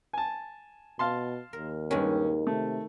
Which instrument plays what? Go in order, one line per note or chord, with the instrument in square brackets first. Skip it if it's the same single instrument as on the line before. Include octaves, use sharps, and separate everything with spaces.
[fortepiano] G#5 A5
[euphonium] B2 [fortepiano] F5 A5 C6
[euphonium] D#2 [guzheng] A#4
[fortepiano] G2 C#4 [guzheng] D#3 G#3
[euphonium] C3 [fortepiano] A3